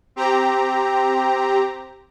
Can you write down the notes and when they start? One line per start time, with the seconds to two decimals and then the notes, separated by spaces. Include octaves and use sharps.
0.16 C4 G4 A#5